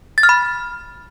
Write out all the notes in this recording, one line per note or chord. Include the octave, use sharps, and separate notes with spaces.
A6
F6
B5